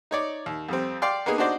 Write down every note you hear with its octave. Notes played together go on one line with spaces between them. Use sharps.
D#4 C#5 D5
D#2
F2 G3 C4
D5 F5 G5 C6
A#3 B3 D#4 G#4
D4 D#4 F#4 C5 D5